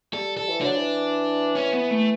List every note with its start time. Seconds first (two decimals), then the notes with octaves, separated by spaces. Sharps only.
0.13 G3 A4
0.37 A4
0.48 E3
0.61 F#3 D4
0.76 E3
1.55 C#4
1.73 B3
1.91 A3